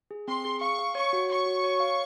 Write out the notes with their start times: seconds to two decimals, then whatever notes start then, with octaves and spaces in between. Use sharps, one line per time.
0.11 G#4
0.28 C4 C6
0.45 G#4
0.61 F5 C#6
0.79 F5
0.95 C#5 C#6
1.13 F#4
1.30 C#5 C#6
1.46 F#4
1.64 C#5
1.80 F5